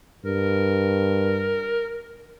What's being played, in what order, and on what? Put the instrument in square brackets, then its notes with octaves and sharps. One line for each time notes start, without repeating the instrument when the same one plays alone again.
[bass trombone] G2 [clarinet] A#4